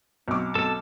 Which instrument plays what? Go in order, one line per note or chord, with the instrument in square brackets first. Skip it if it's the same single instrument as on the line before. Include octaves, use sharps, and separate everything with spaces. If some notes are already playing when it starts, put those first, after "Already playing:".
[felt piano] B1 D6 [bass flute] C4
[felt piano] B1 [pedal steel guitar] A4 A5